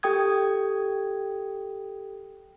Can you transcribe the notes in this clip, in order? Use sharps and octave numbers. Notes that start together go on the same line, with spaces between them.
G4 A4 G5 D#6 G#6